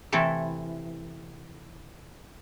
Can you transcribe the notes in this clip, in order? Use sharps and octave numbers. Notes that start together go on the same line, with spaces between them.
C3 E3 A3 C4 E4 A4